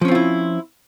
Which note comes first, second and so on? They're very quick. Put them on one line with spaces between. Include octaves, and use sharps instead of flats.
F3 C#4 C4 F4 E4